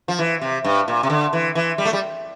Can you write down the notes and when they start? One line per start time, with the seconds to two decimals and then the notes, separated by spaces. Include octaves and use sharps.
0.08 F3
0.19 E3
0.41 C3
0.64 G2
0.88 A#2
1.03 C3
1.10 D3
1.33 E3
1.55 E3
1.78 G3
1.85 A3
1.93 G3